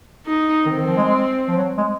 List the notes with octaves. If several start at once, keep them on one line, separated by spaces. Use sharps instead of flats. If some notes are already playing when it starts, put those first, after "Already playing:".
D#4
D#3 C4
D#3
F3
G#3
G#3
F3
F#3
G#3